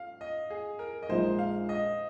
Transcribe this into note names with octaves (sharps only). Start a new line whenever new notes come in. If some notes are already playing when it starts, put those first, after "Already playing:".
Already playing: F5
D#5
G#4
A#4
D#5
A#1 A#2 G#3 D#4 C5
F5
D#5